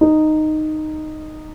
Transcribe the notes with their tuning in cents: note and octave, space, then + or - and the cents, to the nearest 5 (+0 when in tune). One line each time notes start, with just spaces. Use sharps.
D#4 -10